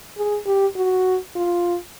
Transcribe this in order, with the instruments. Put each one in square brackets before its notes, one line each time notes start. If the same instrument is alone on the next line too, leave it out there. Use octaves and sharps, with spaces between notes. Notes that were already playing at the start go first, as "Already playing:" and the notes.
[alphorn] G#4
G4
F#4
F4